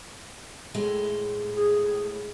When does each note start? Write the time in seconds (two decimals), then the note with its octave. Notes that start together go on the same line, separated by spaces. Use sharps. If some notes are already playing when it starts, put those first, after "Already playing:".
0.75 A2 G#3
1.54 G#4